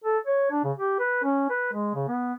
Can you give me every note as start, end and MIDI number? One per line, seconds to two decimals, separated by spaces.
0.04 0.18 69
0.27 0.51 73
0.51 0.63 62
0.64 0.72 49
0.77 0.98 67
1.00 1.19 71
1.24 1.46 61
1.50 1.70 71
1.73 1.92 56
1.95 2.06 49
2.08 2.33 59